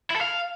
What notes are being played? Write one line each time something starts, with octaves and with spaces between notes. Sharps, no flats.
E4
A4
F5